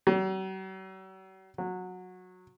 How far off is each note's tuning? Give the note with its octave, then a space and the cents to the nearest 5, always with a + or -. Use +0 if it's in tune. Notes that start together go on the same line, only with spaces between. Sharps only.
F#3 +45
F#3 -15